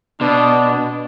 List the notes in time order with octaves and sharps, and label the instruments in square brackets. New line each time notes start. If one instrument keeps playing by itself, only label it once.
[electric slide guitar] B2 [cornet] D4